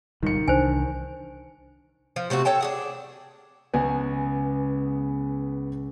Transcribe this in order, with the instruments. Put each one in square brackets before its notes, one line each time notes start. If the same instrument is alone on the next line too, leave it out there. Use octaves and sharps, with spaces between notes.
[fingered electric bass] D#1 C#2 G3 [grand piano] D#3 C#7
[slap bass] C2 E3 [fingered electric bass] D4 [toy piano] C5 G#5
[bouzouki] F3
C3 A3 C4 F#4
A4 C#5 G5 A5
D4 G#4 F#5
[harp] C#2 [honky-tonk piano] B3 G#5